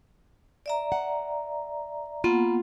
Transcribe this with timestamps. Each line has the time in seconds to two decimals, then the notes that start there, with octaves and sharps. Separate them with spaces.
0.66 D5 E5 A#5
0.92 F#5
2.24 A#3 B3 F4 F#5